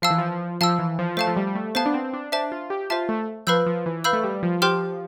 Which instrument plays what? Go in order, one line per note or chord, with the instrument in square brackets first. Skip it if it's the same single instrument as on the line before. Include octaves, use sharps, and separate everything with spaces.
[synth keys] F3 [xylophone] F5 A5 E6
[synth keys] E3
F3
F3
[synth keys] F3 [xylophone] F5 A5 E6
[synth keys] E3
F3
[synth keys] A3 [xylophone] C5 F5 A5
[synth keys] F3
G3
G3
A3
[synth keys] B3 [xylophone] C5 F5 A5
[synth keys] D4
C4
C4
D4
[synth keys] D4 [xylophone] C5 E5 A5
[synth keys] F4
G4
[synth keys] F4 [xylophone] C5 E5 A5
[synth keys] A3
[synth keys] F3 [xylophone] B4 F5 B5 E6 G6
[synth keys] F3
E3
[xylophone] B4 F5 B5 E6 G6
[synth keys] A3
G3
F3
[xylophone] G4 C5 G5 C6 F6